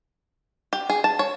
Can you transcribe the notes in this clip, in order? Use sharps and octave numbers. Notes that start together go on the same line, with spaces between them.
G4
G#4
A5
C#5